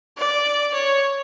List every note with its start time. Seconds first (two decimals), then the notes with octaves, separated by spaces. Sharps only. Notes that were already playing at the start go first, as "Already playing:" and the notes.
0.17 D5
0.74 C#5